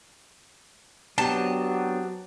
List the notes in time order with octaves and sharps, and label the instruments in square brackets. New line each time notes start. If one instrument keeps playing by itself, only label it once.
[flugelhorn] F#3 [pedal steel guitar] B3 C4 D4 [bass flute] G4 [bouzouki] A5